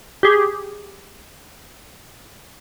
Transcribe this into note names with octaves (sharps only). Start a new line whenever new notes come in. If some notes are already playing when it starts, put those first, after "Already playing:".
G4 G#4